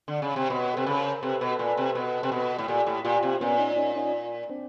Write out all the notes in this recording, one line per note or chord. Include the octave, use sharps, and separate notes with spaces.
D3
C#3
C3
B2 B4 C#5
C3 A4 B4
C#3
A#4 C5
C3 A4 B4
B2
A#2
C3
B2
C3
B2
A2
A#2 G4 A4
A2
A#2 F4 G4
C3
A#2 B3 C#4
C#4 D#4
C#4 D#4
C#4 D#4
C4 D4